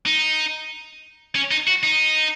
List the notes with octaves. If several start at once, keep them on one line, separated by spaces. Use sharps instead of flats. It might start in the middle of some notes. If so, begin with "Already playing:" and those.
D#4
C#4
D#4
F#4
D#4